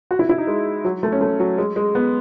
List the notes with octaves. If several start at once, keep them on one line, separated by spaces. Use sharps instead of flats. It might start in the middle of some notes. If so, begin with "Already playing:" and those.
F#4
E4
E4
D#4
G#3
F#3
A3
C#4
A3
F#3
G#3
G#3
B3